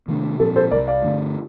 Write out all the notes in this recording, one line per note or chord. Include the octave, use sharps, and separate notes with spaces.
C3 D#3 A3 D4
A#2 F3 C4 A4
A4 C5
C2 C3 G3 A#4 D5
D5 F5
G2 D3 A3